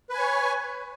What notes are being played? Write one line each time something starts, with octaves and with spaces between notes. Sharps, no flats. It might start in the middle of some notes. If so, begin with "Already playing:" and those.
B4 C#5 G#5